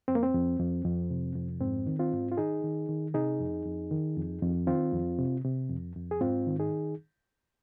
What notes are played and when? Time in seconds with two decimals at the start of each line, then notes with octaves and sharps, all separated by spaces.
0.08 F2 C4
0.15 A#3
0.23 C4
0.34 F2
0.59 F2
0.85 F2
1.10 C3
1.35 F2
1.60 G#2 C4
1.87 D#3
1.99 C4 F4
2.13 G#2
2.31 F4
2.37 D#3 D#4 G#4
2.64 D#3
2.89 D#3
3.14 C3 D#4 G#4
3.40 F2
3.65 F2
3.91 D#3
4.17 F2
4.42 F2
4.67 D#3 C4 F4
4.93 F2
5.18 C3
5.44 C3
5.70 F2
5.96 F2
6.11 G#4
6.21 G#2 C4 F4
6.46 D#3
6.59 D#4 G#4